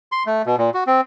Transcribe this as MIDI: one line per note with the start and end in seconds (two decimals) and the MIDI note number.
0.12 0.23 84
0.26 0.42 57
0.46 0.56 47
0.58 0.70 46
0.74 0.84 66
0.87 1.01 60